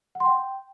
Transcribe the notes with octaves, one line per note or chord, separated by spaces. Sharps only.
F#5
C6
G5